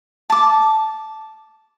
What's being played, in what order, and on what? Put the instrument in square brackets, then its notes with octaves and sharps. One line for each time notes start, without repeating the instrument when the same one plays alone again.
[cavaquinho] A5 D6